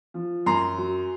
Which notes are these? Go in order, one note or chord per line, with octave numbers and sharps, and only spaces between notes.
F3
F#2 A#5 C6
F#3